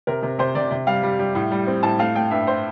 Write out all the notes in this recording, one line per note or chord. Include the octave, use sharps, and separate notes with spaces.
C3 A#4
C3
C3 C5
C3 D5
C3
G3 F5
G3
G3
A2
G3
C4
A2 A5
A3 F5
A3 G5
G2 E5
C5